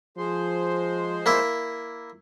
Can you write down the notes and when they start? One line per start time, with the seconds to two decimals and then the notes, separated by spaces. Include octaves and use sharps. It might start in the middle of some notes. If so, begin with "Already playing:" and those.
0.17 F3 G#3 C5
1.26 A#3 E4